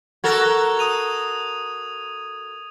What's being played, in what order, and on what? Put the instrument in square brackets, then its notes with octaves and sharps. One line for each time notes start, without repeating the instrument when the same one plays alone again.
[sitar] F#4 A4 A#4 [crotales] G#6
[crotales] D#6 D#7 F7